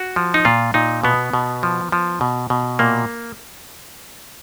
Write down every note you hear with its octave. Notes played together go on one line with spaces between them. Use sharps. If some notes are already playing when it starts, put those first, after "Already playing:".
Already playing: F#4
F3
D#4
A#2 F4
A#2 D#4
B2 B3
B2
F3
F3
B2
B2
A#2 A#3